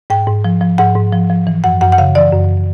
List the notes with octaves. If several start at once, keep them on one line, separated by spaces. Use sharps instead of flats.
G#2 G5
G#2
F3
F3
G#2 F#5
G#2
F3
F3
E3
F#2 F#5
F#2 F#5
F#5
C#3 F5
E3 D5
F#2